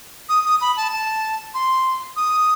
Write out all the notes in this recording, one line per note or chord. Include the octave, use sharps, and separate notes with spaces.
D#6
D#6
B5
A5
A5
C6
D#6